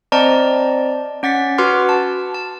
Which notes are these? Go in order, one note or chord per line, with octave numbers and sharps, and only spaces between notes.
C4 C5 D5 D#5 A5 A#5
C#4 F#5 A6 B6
F#4 B4 F#5 C6 D6 F6
A5
A5